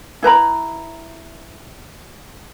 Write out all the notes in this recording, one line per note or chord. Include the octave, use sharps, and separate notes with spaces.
E4 B4 A#5 B5